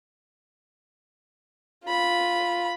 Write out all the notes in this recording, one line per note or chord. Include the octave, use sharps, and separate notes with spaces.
F4 B5